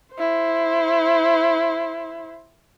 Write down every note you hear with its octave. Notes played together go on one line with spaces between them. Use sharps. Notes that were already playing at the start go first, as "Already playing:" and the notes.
E4 C5